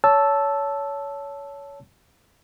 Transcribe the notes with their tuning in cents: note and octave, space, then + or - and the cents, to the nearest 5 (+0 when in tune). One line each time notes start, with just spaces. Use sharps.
C#5 +25 A5 -5 E6 +0